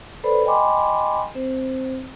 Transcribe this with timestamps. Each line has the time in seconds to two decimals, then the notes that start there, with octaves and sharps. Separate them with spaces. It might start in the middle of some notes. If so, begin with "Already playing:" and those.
0.23 A4 B4 C5 D5 B5
0.45 D#5 G5 G#5 B5 C6 D6
1.35 C4 C5